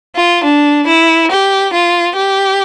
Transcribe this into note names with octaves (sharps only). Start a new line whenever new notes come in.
F4
D4
E4
G4
F4
G4